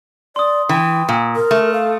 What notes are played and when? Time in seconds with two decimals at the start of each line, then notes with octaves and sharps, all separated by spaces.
0.36 D5 C6 D#6
0.69 E3 G5
1.09 A#2
1.36 A#4
1.51 A3
1.74 F5